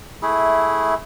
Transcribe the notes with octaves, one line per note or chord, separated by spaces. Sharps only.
A3 E4 G#4